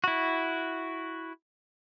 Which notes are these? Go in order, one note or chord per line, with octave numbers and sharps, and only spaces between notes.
E4 F#4